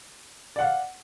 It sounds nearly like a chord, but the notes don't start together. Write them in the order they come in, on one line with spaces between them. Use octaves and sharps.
D5 F#5 F5